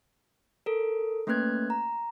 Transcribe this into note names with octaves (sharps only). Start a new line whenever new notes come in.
A4 A#4
A3 A#3 C#4 B4 F#6 G#6
A#5